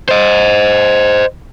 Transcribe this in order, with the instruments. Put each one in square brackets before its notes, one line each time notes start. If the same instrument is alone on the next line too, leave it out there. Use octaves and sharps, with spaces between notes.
[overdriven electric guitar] C5 D#5